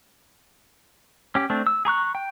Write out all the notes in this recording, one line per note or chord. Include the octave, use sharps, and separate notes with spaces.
C#4 G4
A3 C4 D4
E6
G#4 A#5 C#6 F#6
G5